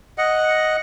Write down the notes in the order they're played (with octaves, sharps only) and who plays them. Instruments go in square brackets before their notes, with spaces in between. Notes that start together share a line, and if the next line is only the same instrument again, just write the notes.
[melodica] D#5 F#5